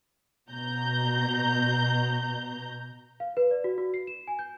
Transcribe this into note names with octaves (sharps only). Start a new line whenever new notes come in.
B2 A#5 G6
F5
B4
D5
F#4
F#4
C7
E7
G#5
G6